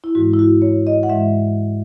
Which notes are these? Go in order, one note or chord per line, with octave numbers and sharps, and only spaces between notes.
E4
G#2 E3 G#3 F#4
E4
F#4
C#5
D#5
F#5
G#2 E3 G#3 E5